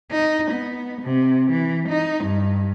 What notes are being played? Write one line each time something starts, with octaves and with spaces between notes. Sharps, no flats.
D#4
B3
C3
E3
D#4
G2